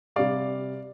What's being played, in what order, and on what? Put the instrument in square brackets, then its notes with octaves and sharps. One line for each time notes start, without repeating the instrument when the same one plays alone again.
[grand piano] C3 G3 D5 F5